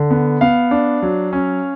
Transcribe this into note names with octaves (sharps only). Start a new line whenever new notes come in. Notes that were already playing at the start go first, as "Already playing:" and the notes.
Already playing: D3
B3
B3 F5
D4
F#3
C#4